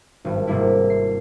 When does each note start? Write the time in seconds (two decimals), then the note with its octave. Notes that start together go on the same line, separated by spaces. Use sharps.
0.25 G#1 G2
0.47 G#2 C3 G#3 A#3 E4
0.90 C7